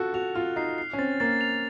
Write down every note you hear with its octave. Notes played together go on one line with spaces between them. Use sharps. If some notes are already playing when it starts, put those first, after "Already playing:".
Already playing: F4 F#4 A4 F#6
F#4 F7
F4 F6
D#4 C7
C7
C#4
C4 A6
A#3 A6
F7